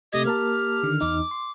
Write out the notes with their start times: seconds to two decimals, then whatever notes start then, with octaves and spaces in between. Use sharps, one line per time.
0.13 C3 A3 G4 D#5 G#6
0.25 A#3 A#4 A5 F6
0.83 D3 D#3
1.01 E2 D#4 D6
1.31 C6